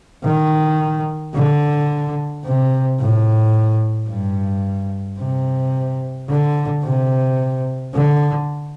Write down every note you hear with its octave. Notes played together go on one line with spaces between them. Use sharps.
D#3
D3
C3
A2
G2
C3
D3
C3
D3